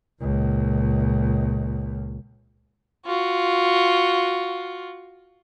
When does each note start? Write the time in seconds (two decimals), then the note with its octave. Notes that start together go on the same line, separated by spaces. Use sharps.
0.21 C#2 A#2
3.06 F4 F#4